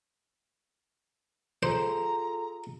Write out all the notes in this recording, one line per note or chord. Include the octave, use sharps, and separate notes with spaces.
F4 G#4 A4 C5 A#5